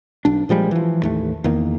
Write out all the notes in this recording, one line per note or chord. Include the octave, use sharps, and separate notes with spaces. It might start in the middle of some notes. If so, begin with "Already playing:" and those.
B1 D4
A#2 F3 G3 G#3
E3 F3
A1 D#2 A3
E2 D#3 A#3